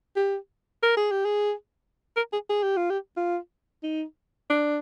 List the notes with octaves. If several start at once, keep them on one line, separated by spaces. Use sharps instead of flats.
G4
A#4
G#4
G4
G#4
A#4
G#4
G#4
G4
F4
G4
F4
D#4
D4